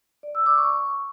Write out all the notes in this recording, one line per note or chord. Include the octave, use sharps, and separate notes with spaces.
D5
E6
D6
C#6
C#6